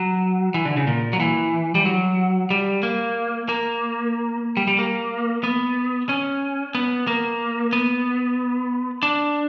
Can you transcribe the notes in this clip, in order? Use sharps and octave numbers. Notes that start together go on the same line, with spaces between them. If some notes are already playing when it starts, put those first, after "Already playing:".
Already playing: F#3
E3
D3
C#3
A#2
F#3
E3
G3
F#3
G3
A#3
A#3
G3
G3
A#3
B3
C#4
B3
A#3
B3
D4